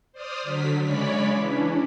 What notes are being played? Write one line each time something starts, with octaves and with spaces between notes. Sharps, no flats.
C5 D5 D#6 F6
D3 F#3 B6
C#3 G#3 C#5 D5 B5 B6
E3 C#4 D4